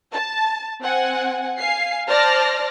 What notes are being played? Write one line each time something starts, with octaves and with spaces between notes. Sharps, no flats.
A5
C4 F#5 G#5
F5 G#5 C7
C5 D5 A5 F6 A#6